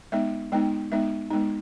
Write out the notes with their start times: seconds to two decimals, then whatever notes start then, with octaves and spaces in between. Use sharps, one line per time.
0.12 G#3 B3 D#4 E5
0.52 G#3 B3 D#4 G5
0.92 G#3 B3 D#4 E5
1.31 G#3 B3 D#4